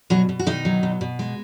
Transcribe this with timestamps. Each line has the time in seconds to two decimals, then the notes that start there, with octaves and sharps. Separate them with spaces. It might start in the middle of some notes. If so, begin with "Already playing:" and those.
0.10 B2 F#3 F#4
0.29 B2
0.39 F#4
0.46 B2 D#3 D#4
0.65 F#3
0.83 B2
1.01 B2
1.19 G#3